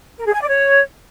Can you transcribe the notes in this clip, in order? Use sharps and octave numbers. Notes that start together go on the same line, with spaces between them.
A#4
G#4
G#5
D5
C#5